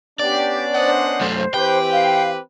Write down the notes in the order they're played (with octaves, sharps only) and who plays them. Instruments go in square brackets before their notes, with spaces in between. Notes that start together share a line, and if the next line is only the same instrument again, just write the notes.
[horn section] B3 C#4 D4 [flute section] G4 [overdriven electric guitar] D5
[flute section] C5 [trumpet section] D#5 F#5
[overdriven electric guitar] F#2 A3
[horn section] E3 C4 G4 [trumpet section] B4 [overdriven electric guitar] G5
[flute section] F5